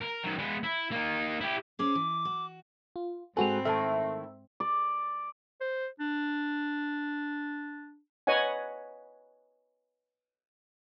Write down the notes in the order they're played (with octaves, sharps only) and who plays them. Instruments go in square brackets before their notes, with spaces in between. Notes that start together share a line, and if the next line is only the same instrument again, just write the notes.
[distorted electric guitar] A#4
D#3 F#3
G#3 B3
E4
A#3 D#4
E4 G4
[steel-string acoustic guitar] C#4 G#4 C5 [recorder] D6
[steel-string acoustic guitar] E3
F#4
[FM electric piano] F4
[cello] G#2 C4 [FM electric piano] G#3 F#4 A4 [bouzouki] B4 [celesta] G#5 F7
[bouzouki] D#3 A3 E4 [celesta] A4 A5 [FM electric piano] E5
[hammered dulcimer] D5
[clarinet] C5
D4
[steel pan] B4 C#5 D#5 F#5 G#5